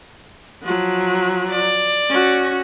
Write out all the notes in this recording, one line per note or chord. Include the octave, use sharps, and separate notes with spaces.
F3 F#3
D5
C#4 F#4